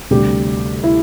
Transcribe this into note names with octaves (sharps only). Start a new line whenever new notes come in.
D2 C3 G3 G4
E4